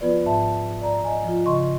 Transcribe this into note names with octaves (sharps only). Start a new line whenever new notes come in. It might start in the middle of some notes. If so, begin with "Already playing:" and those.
F3 B3 F4 B4 D5
G#2 E5 A5
D5 A#5
D#5 G#5
F3 F4
C#3 D#5 C6 C#6